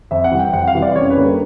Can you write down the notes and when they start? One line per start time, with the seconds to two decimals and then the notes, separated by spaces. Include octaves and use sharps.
0.11 F2 E5
0.24 F#5
0.31 C3 E3 G3
0.39 G5
0.53 F2 F#5
0.68 F5
0.75 C3 E3 G3
0.82 D5
0.96 F#2 C#5
1.10 B4
1.17 D3 G3 A#3